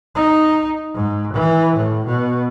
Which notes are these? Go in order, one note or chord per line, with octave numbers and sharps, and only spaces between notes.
D#4
G#2
E3
A2
B2